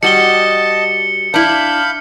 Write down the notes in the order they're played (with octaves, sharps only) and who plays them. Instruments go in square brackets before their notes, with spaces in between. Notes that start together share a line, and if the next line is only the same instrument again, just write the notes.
[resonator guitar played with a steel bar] G3 F#4 [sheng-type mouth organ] D#5 A5 [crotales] C#7 G7
[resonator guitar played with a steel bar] D4 E4 [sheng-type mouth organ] F5 B5 G6